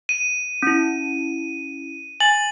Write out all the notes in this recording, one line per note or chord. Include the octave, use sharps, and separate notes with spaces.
D#7
C#4 E4
G#5 A6 F#7